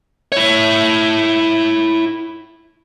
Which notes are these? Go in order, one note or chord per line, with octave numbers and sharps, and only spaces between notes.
E4 C#5